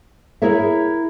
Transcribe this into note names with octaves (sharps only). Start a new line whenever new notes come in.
E4 G#4 A#4 C#5 E5